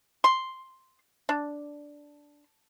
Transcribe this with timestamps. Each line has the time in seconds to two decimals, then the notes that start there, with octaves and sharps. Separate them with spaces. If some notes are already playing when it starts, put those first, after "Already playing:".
0.24 C6
1.29 D4